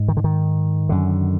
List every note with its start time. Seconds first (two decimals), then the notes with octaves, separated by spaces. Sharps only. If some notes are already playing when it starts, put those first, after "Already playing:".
Already playing: G#2
0.08 D#3
0.17 D3
0.24 D#3
0.89 F#2 D3